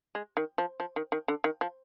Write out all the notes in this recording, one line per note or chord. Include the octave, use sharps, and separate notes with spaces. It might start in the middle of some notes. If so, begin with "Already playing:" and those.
G#3
D#3
F3
F3
D#3
D#3
D3
D#3
F3